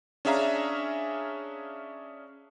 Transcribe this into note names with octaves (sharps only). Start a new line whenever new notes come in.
C#4 D4 G#4 E5 F5 A#5